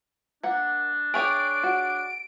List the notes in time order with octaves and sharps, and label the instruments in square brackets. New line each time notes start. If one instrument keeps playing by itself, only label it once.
[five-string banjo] A#3 F#5 [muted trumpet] D4
[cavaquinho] G#4 C#5 D5 [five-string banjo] E5 G5 [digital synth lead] D7
[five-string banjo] F#4